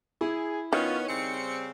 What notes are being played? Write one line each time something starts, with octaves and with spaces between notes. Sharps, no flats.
E4 G#4
D#3 B3 C#4 F4
C#3 G3 C4 C#7